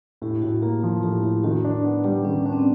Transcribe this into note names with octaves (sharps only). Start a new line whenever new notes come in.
A2 G4
A2 F#4
A#3 G4
F3
A2 G4
A2 G4
D#3 F#4
D4
B3
G3 G4
D#3 C#4
C#4 D4
C4
B3